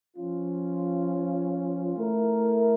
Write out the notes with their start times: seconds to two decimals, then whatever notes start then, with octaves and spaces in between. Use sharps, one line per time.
0.17 F3 C#4 F4
1.97 A3 E4 A#4